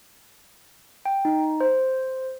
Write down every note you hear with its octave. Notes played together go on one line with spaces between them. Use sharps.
G5
D#4
C5